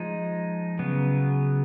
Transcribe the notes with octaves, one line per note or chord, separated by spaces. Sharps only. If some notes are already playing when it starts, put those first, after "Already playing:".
Already playing: F3 G#3 D#4
C#3 F#3 B3